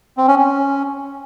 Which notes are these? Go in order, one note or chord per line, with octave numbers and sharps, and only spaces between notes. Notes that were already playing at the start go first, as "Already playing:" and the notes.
C4
C#4
C#4